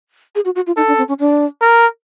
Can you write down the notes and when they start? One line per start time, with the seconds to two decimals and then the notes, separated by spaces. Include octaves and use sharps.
0.35 G#4
0.45 F#4
0.55 F#4
0.67 F4
0.77 D#4 A4
0.88 D4
0.98 C4
1.08 C#4
1.19 D4
1.61 A#4